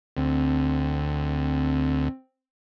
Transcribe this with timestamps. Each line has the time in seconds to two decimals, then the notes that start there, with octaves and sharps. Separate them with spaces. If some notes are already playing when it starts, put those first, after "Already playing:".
0.17 D2 C4